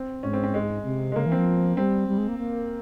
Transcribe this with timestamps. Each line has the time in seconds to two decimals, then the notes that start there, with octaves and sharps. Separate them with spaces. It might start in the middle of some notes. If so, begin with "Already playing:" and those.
Already playing: C4
0.23 G#2 C#4
0.33 C4
0.44 C4
0.54 G#3
0.85 C3
1.12 G#3
1.16 C#3 A#3
1.26 E3
1.32 F3 C4
1.77 G3 C4
2.09 G3
2.18 G#3
2.28 A#3
2.39 A#3